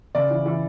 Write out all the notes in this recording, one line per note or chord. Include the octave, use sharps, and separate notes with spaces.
C#3 D5
E3
E3